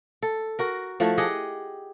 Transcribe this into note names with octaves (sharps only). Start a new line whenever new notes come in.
A4
F#4 A#4
F3 A3 E4 F#4
G4 G#4 D#5 F#5